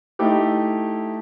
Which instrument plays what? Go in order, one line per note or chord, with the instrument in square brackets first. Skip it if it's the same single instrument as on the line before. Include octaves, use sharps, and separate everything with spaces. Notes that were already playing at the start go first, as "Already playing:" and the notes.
[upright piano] A3 D#4 E4 G4